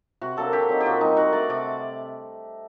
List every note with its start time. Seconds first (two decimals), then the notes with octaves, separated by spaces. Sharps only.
0.21 C3 F#4
0.37 F#3 A#3 D4 A4
0.53 D3 G4
0.69 F#3 C4 D#4
0.80 G4
0.86 A#2 F#4
1.01 G3 C4 D#4
1.17 D#3 F#4
1.33 A3 D4 D5
1.49 C3 D5